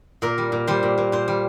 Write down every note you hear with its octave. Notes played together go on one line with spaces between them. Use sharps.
A#2 A#4
G3
A#2
G3 C5
A#2
A#2
A#2 C5
G3